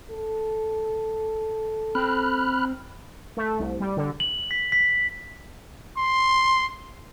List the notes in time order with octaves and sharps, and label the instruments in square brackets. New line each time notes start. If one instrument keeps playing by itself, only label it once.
[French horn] A4
[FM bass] C4 [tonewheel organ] B5 F6 F#6
[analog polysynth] A3
C2
G3
D3
[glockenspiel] F#7
B6
B6
[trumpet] C6